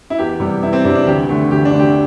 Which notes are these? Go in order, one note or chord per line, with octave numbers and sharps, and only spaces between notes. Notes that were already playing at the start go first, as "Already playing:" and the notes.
E4
E2 G4
C3 G3
E2 E4
C4
C3 G3 D4
D4
D2 G4
D3 A3
D2 G4
D4
D3 A3
G4